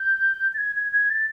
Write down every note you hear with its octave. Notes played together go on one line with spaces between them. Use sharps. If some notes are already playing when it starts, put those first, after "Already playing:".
Already playing: G6
A6
G#6
G#6
G#6
A6